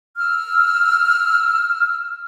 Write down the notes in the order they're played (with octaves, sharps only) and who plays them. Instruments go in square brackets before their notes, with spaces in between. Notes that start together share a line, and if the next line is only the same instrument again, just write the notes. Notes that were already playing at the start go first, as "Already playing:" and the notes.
[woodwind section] E6 F6